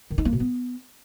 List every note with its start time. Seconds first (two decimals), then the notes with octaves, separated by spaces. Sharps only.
0.11 D#3
0.18 D#4
0.25 A#3
0.33 B2
0.40 B3